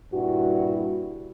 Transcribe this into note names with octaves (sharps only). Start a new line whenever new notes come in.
G2 A#2 E4 F#4